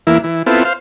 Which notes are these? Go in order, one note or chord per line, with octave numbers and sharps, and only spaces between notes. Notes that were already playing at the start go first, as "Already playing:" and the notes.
E2 E3 A#3 E4
E3
B3 C4 E4 F4 A4
C5 F5